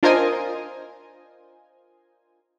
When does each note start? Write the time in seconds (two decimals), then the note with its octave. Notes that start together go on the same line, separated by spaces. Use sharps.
0.03 D4 F4 A#4 C5 D#5 G#5